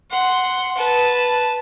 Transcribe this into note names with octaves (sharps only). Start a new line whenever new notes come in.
F#5 C6
B4 A5